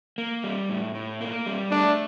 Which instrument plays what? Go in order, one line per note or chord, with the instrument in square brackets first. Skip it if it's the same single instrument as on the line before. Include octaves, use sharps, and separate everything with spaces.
[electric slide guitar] A#3
G3
A2
A2
A#3
G3
[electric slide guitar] A3 [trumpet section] D4